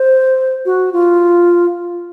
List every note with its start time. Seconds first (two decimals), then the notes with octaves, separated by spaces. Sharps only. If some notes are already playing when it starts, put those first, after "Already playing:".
Already playing: C5
0.65 F#4
0.93 F4